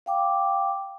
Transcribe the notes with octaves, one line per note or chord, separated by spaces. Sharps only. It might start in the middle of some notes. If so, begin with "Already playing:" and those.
F5 G5 D6